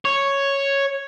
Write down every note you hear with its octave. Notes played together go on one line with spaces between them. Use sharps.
C#5